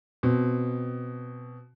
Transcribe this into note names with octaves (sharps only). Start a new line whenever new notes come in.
B2 C4